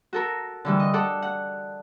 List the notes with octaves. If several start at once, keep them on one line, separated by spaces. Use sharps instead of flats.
F#4 A4 A#4
D3 E3 G3
D#5
A4 D5 F#5
F#5